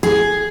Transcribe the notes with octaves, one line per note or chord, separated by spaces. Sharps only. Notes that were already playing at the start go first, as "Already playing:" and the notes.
G#4